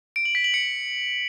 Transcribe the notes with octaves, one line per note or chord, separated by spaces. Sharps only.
D7
F#7
B6
F#7
C#7